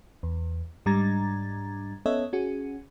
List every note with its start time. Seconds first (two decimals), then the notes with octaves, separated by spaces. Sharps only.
0.23 E2
0.86 G#2 G3 D4 A#5 G#6 A6
2.06 B3 C#4 A4 C#5 D#5 E5
2.33 C#4 F#4 G#4